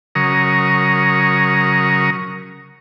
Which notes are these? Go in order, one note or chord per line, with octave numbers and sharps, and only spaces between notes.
C#3 F#3 A#4 A#5 C#6 D#6